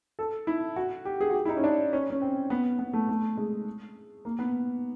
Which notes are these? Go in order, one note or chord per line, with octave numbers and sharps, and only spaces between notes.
A4
E4
F#4
G4
G#4
F#4
G4
E4
D#4
C#4
D4
C#4
C#4
C4
B3
B3
A3
A3
G#3
A#3
B3